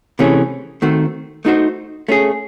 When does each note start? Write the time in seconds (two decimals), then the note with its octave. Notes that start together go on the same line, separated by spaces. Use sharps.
0.19 C3 E3 A3 C#4 G#4
0.82 D#3 A3 C4 F#4
1.45 A3 D#4 F#4 C5
2.08 A3 C#4 G#4